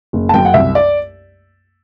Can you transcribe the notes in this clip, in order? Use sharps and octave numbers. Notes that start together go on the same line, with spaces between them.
F#1
A5
F#2 G5
F#5
C2 E5
D5